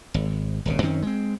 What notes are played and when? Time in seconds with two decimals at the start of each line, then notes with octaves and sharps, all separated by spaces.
0.14 G#1
0.66 D#1 G#1 C#3
0.82 F#2 D#3 C4 C#4
1.02 G#3 C4